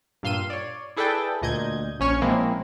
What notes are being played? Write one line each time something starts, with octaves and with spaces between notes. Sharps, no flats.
G2 A#2 F5 C6 E6 D#7
C#5 D5
E4 G#4 A4 B4 D5 G5
D2 A#2 D#5 G6 G#6
A#1 C#4 C#5 F6
A#2 F3 G#3 A#3 C4 E4